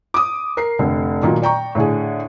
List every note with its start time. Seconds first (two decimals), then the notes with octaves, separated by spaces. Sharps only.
0.14 D6 D#6
0.57 A#4 C7
0.79 F1 D3
1.23 A#2 D#3 F#3 F4
1.42 D5 G5 A#5 C#6
1.75 A2 D3 G#4